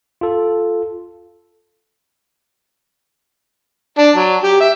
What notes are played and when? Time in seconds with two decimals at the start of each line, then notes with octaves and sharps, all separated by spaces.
0.21 F4 A4
3.98 D4
4.16 F#3
4.43 G4
4.61 E5